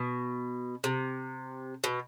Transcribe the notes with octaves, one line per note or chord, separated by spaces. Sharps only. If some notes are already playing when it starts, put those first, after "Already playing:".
Already playing: B2
C3
B2